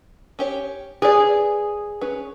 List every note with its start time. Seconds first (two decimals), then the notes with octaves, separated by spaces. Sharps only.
0.39 C#4 G4 C#5
1.02 G#4 B4 D5
2.01 C#4 B4